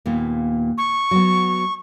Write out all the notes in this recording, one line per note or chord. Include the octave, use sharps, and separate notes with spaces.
D#2 A#2 B3
C#6
F#3 B3